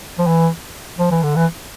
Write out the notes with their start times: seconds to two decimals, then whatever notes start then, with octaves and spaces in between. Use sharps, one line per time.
0.18 F3
0.27 E3
0.99 F3
1.11 E3
1.23 D3
1.36 E3